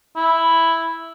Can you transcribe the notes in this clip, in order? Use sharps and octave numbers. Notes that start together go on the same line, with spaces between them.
E4